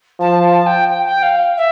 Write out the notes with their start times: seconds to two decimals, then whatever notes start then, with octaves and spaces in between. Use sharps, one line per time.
0.20 F3 A5
0.43 A5
0.66 G5
0.88 G5
1.05 G5
1.22 F5
1.57 E5